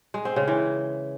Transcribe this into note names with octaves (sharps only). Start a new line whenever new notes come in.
G#3
C4
C#3
E3